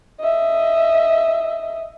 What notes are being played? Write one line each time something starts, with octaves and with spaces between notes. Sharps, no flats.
D#5 E5